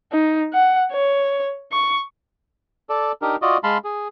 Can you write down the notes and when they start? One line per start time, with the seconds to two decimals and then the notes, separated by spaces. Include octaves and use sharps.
0.12 D#4
0.53 F#5
0.92 C#5
1.72 C#6
2.89 A4 D5
3.22 D4 D#4 G4 A#4
3.42 F4 F#4 D5 D#5
3.64 G#3 F5 A5 B5 C6
3.84 G#4